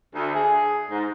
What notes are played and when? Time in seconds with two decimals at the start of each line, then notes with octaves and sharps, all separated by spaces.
0.15 D2
0.35 G#4
0.90 G#2